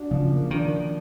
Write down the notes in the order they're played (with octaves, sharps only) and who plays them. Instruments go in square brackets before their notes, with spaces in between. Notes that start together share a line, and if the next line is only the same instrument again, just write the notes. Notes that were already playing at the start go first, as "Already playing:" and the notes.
Already playing: [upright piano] D4 F#4
[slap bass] C#3 [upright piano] F3
[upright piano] A#3
[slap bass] D#3 [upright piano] D4